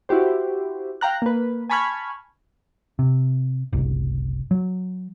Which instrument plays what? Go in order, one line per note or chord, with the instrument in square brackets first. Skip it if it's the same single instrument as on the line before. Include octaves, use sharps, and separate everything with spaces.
[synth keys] E4 F#4 G4 C5
F5 G5 A#5 F#6
A#3 B4
G#5 A5 B5 C#6 F6 G#6
[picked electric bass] C3
F#1 C2
F#3